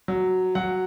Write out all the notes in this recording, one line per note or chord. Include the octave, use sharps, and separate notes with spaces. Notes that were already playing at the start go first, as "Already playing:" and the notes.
F#3
F#3 F#5